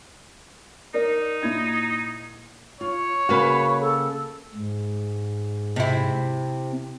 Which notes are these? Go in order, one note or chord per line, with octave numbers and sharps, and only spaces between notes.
D#4 A#4 D5
A#2 E4 G#6
F4 C#5
C#3 A#3 F#4 B4 F5
A4
G#2
C3 E4